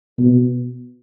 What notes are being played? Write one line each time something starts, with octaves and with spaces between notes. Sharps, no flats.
B2